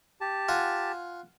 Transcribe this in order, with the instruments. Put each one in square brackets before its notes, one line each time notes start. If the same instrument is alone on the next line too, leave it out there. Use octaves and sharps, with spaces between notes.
[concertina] G4 A5
[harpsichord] F4 F#5 G#5